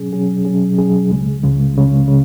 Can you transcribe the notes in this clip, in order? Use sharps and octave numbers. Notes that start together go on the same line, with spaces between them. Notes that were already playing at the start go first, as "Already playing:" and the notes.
Already playing: B2 F#3 C#4 G#4
B2 F#3 C#4 G#4
B2 F#3 C#4 G#4
B2 F#3 C#4 G#4
C#2 C#3 G#3
C#2 C#3 G#3
C#2 C#3 G#3
C#3